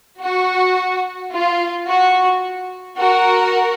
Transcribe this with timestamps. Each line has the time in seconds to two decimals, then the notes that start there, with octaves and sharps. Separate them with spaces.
0.21 F#4
1.32 F4
1.87 F#4
2.97 F#4 A#4